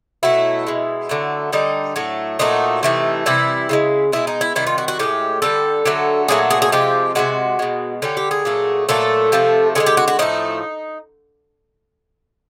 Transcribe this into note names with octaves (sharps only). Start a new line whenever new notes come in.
B2 F#3 A3 E4
B2 G#3
D3 F#3 A3
D3 G3 D#4
A2 F#3 A3
A#2 F#3 A3 D#4
C3 E3 A3
C3 E3 G3 E4
C#3 F3 G#3
B2 G#3 E4
D#4
E4
C3 D#3 G3 E4
F4
F#4
F#4
A2 E3 G#3 G4
D3 G3 A4
D3 F#3 A3
A#2 F#3 A3 G#4
G#4
G#4
C3 F3 G#3 G4
C3 E3 G#3 F#4
B2 G#3
D3 G3 C#4
G4
G#4
A#2 F#3 A3
A#2 F#3 A3 A4
C3 F3 A3
D3 F3 G#3 G#4
G4
F#4
F#4
A2 F3 A3 D#4